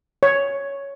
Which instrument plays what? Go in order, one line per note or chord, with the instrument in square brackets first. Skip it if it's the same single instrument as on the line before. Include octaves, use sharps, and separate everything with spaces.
[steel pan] C#5